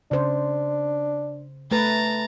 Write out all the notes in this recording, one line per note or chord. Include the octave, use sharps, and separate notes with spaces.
C#3 D4 C5
A3 B4 A#5 A6